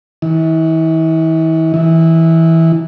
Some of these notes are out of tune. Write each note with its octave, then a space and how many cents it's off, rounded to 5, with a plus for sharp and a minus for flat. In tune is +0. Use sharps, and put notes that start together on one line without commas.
E3 -40
E3 -15